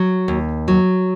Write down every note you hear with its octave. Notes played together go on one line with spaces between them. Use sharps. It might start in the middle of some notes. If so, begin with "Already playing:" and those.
Already playing: F#3
D#2
F#3